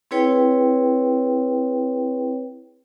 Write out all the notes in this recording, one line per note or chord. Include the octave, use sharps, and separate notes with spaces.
C4 E4 G#4 B4 C#5 G5